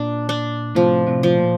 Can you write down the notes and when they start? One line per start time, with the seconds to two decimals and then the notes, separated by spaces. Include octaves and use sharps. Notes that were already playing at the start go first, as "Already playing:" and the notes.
Already playing: A#2 D4
0.29 D4
0.75 A2 C3 F3
1.07 A2 C3
1.23 F3
1.38 A#2